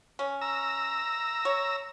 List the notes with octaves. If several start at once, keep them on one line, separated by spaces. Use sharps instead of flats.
C#4
A#5 E6
C#5